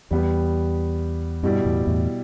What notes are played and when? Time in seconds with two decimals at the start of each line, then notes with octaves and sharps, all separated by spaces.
0.11 E2 G3 B3 G4
1.43 G2 B2 G3 E4 G4 D5
1.65 E2 A2
1.87 E2 A2